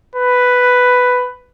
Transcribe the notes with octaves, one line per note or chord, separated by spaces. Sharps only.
B4